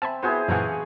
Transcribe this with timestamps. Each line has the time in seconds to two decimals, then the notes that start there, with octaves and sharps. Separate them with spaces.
0.02 C4 E5 G#5 A5 B5
0.22 B3 E4 F#4 G#4 C5
0.48 A1 F#2 A#2 E3 F5 F#5 C#6